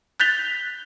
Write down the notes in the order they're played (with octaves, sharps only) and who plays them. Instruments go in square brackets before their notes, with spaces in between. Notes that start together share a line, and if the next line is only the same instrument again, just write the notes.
[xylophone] F#6 G6 A6 B6 F7 G7